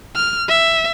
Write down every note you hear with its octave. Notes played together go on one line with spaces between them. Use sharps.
F6
E5